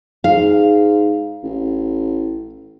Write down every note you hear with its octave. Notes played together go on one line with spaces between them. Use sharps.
G#2 F5
A1